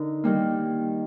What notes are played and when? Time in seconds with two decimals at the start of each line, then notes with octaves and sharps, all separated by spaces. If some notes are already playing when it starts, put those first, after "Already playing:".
Already playing: D3 D#4 A#4
0.24 D#3 G3 A#3